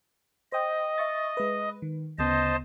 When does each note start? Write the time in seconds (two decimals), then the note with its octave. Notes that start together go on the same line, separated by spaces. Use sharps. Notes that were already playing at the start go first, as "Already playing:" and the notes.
0.52 C5 D#5 G5 D#6
0.98 E5 C#6 A6
1.37 G#3 B4
1.82 D#3
2.18 D2 C#3 B3 C5 D#5 A5